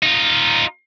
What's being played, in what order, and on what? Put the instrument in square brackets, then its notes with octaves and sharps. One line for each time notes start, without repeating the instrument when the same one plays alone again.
[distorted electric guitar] D#4 F4